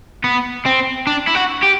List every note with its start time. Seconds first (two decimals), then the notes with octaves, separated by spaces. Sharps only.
0.24 B3
0.65 C4
1.07 D4
1.28 E4
1.35 F#4
1.63 G4